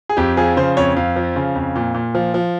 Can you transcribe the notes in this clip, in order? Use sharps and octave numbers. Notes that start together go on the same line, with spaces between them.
G#4
F2 G4
F3 G#4
C#3 C5
F2 C#5
F2 F5
F3
C#3
F2
A#2
A#2
F3
F3